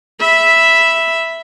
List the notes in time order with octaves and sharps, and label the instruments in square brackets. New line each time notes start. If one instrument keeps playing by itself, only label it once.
[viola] E5 B5